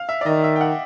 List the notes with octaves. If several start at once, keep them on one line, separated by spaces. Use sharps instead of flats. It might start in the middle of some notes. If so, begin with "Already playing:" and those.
Already playing: F5
E5
D5
D#3 D#5
E5
G5
F#5